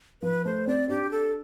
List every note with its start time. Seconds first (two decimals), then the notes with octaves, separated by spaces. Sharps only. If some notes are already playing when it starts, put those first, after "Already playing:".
0.22 F3 B4
0.45 A3 C5
0.67 C4 D5
0.89 D4 G4
1.11 A4